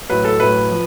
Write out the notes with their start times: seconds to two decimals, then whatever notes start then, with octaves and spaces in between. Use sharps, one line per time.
0.10 A2 F#3 B4
0.25 A4
0.40 A2 F#3 B4
0.71 F3